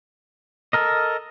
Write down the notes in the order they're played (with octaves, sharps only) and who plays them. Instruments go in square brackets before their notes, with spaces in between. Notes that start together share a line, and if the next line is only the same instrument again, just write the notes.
[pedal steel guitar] A4 A#4 D#5